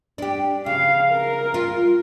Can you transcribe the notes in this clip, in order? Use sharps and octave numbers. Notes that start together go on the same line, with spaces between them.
D4 G4
C#3 F5
A#4
F4